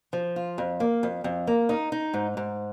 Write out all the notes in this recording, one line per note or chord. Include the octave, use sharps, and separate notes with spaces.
F3
F4
F2
A#3
F2
F2
A#3
D#4
D#4
G#2
G#2